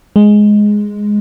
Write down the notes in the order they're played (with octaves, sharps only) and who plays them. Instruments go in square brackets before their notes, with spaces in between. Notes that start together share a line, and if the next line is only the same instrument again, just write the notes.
[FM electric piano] G#3